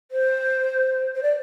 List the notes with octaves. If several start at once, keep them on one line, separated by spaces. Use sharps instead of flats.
C5
C5
D5